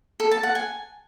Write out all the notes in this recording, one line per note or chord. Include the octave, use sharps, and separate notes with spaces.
A4
A5
F#5
G#5